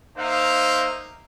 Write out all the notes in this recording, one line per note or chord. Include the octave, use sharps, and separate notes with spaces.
A#3 D#4 C5 E5 F5